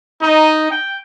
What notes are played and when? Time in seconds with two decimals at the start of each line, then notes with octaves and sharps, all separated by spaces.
0.22 D#4
0.70 G5